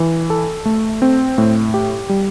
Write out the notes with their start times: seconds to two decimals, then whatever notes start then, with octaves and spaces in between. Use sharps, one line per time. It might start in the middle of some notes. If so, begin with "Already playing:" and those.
Already playing: E3
0.30 A4
0.65 A3
1.02 C4
1.38 A2
1.74 G4
2.09 G3